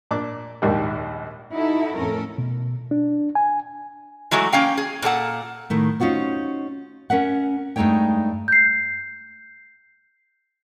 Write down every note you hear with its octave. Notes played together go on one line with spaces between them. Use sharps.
A#2 D4 D6
A#1 D#2 G#2 G3
D#4 E4 F#4 A4 E5
F2 A2 C#4 A4 A#4
B2
D4
G#5
E3 F#3 G#3 A3 F#4
A#3 C#4 F5 G5
G#4
A#2 A#3 A4 F#5
A2 D#3 A3
C#4 D#4 F4 F#4 C5
C#4 A#4 E5 F#5
G2 G#3 A3 D#4 C#5 G5
G6 C7